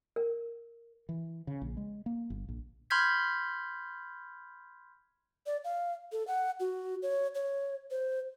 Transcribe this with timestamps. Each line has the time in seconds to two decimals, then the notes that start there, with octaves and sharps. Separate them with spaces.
0.16 A#4
1.09 E3
1.47 C#3
1.62 A#1
1.77 G#3
2.06 A#3
2.30 G1
2.48 A#1
2.90 B5 C6 F6 G6 G#6 B6
5.46 D5
5.64 F5
6.12 A4
6.27 F#5
6.60 F#4
7.02 C#5
7.35 C#5
7.91 C5